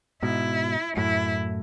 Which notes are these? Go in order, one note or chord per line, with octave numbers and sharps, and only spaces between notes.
G#2 B2 E4
F#2 A2 E4